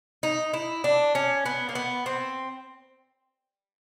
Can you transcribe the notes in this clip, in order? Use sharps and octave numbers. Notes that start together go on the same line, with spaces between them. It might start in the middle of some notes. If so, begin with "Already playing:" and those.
D#4
E4
D4
C#4
B3
A#3
B3
C4